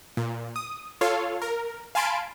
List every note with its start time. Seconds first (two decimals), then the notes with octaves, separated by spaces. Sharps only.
0.17 A#2
0.56 D#6
1.01 F4 A4 C#5 F5
1.42 A#4
1.95 F5 G#5 A5 B5 C6 D7